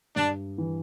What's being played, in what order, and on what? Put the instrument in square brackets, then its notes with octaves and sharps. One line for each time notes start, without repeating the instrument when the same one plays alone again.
[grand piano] G2 [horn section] D4
[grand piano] E3